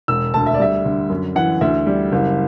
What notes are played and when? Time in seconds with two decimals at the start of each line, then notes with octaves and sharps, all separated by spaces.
0.08 E1 E6
0.34 D2 A5
0.46 E5
0.54 D5
0.60 G3 E5
0.85 D3
1.10 F#2
1.36 E3 F#5
1.61 D2 E5
1.87 G3
2.12 F#1